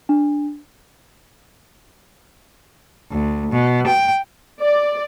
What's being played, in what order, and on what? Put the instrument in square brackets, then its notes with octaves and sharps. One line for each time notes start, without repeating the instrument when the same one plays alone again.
[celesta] D4
[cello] D2
B2
G5
[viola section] D5